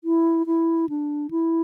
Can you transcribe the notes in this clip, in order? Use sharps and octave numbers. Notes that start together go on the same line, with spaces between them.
E4
E4
D4
E4